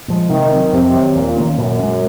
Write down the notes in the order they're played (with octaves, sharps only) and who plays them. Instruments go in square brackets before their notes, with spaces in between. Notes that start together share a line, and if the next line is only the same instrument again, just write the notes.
[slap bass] A#2 F3 G#3
[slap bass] C3 [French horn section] D#3
[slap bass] F#3 C4
[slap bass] F2 [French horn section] C3
[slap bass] D#3 F#3
[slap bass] D#2 [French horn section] A#2
[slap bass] D#3 A#3 C#4
[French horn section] F#2 [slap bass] A#2
[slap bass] G#3 C#4